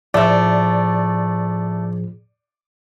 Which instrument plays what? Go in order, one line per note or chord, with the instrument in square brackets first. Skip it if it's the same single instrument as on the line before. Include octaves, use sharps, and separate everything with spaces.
[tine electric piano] A2 F3 G#4 [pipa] A3 E5 [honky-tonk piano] D5